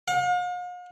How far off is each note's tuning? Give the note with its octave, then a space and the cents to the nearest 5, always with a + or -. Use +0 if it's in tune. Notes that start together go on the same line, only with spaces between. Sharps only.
F5 +45